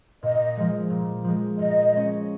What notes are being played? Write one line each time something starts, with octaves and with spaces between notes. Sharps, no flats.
A#2 D#5
F3 G#3
A#2
F3 G#3
A#2 D#5
G#3 C#4